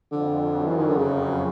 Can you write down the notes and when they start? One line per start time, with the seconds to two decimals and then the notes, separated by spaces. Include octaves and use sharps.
0.12 F2 D3
0.55 F#2
0.66 E3
0.76 D#3
0.87 D3
0.98 C#3